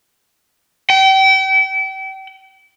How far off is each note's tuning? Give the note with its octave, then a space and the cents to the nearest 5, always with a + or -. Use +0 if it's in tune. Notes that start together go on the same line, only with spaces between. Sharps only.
G5 -35